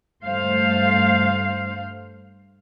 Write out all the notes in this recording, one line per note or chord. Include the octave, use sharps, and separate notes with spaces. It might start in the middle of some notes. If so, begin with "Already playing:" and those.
G2 A3 C5 F5